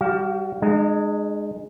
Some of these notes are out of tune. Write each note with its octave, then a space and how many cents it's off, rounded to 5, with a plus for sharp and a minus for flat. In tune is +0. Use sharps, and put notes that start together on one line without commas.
G3 +0 F#4 +35 F5 +0
G#3 +0 D#4 -45